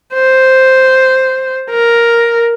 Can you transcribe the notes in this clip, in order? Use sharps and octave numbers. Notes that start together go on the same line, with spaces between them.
C5
A#4